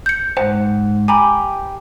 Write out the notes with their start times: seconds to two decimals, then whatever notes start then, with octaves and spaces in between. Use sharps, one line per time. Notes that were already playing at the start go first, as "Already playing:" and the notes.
0.06 G6 C#7
0.37 G#2 C5 F#5
1.08 G4 G#5 A#5 B5